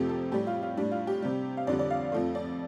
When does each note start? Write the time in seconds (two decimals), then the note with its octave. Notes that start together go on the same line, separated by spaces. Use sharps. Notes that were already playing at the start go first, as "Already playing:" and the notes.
Already playing: F2 C3 F3 A3 G4
0.09 A4
0.32 A2 G3 G4
0.47 F4
0.62 F4
0.77 A2 G3 D4
0.91 F4
1.07 G4
1.22 C3 G3
1.57 F5
1.67 F2 D3 G3 D5
1.79 D5
1.90 F5
2.12 F2 F3 A3
2.35 D5